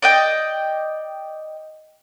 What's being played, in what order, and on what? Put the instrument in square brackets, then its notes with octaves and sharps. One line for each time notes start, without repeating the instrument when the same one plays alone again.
[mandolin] D5 D#5 G5